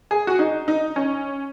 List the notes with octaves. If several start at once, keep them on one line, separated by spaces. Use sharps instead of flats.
G#4
F#4
D#4
D#4
C#4